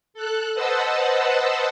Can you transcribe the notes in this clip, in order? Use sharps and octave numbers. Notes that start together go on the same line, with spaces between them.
A4 F#6
B4 C5 D#5 F#5 A5 E6